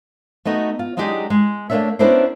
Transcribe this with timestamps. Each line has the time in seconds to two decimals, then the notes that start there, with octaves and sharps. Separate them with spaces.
0.45 A3 B3 D#4 F#4
0.79 F4
0.97 F#3 G#3 D4 D#4 G4 G#4
1.30 G#3
1.70 A3 A#3 C4 D4 C#5 E5
1.99 B3 C#4 D4 E4 A#4 C5